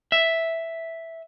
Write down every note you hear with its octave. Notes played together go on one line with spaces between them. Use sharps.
E5